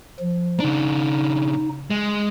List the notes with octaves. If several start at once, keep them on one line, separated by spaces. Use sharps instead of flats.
F3
C#3 D4 D#4
G#3